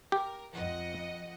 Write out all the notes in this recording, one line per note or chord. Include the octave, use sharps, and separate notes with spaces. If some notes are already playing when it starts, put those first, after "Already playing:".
G4 A#4
F2 D#5 F#5